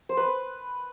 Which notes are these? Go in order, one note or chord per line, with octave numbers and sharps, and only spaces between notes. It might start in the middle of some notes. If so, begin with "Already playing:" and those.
C5
B4